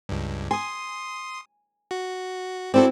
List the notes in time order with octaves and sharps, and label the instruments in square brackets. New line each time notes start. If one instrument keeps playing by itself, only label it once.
[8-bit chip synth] C#2 G2
[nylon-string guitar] G#5 [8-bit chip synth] C6 D#6
[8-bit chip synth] F#4
[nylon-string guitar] C4 E4 F#4 [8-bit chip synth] A4 C5 D5